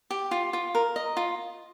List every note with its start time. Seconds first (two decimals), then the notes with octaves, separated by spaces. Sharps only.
0.10 G4
0.31 F4
0.53 F4
0.75 A#4
0.96 D#5
1.17 F4